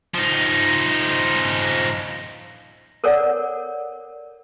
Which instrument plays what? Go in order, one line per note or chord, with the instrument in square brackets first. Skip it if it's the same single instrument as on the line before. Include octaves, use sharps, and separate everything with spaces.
[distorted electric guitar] F3 D#4
[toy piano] A4 A#4 C#5 D5 F#5